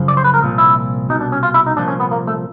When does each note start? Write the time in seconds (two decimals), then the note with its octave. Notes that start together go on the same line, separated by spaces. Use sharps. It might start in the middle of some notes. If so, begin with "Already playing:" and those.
Already playing: F#2 C#3 F3
0.08 D5
0.17 C5
0.24 B4
0.34 A#4
0.41 C2 A#2 F3
0.58 E4
1.09 B2 D#4
1.14 C2
1.21 D4
1.32 C#4
1.43 F4
1.54 E4
1.66 D#4
1.77 C2 A#2 F3 D4
1.88 C#4
2.00 B3
2.11 A#3
2.27 A3